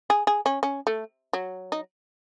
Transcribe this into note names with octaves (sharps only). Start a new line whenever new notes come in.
G#4
G#4
C#4
C#4
A3
F#3
D#4